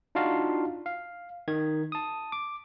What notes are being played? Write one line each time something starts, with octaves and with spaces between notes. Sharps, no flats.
D4 D#4 F4 F#4 F5 A5
F5
D#3 G#6
A5 D#6
D6